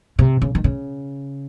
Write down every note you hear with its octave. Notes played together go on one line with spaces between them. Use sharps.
C3
C#3
D#3
C#3